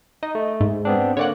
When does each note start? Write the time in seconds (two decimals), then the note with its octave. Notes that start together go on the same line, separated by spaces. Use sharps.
0.23 D#4 D#5
0.35 A3
0.61 G#2
0.85 B3 C4 D4
1.17 D3 A#3 C#5 D5 F#5